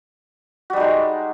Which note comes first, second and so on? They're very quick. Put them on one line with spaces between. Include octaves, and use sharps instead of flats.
F#4 G3 D#4 G#3